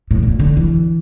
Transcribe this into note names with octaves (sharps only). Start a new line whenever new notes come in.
A2
A#2
D3
E3